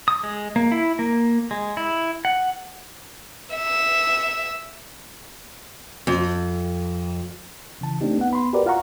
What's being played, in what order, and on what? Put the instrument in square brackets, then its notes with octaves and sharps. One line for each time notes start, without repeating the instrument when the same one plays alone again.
[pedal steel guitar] D#6
G#3
A#3
E4
A#3
G#3
E4
F#5
[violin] E5
[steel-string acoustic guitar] F2
[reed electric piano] C#3 E3 A5
A3 C4 D4 D#4 G4
B3 F#5
B3 B5 C6
F#4 G4 A#4 B4 D5
F4 F5 F#5 A#5 C#6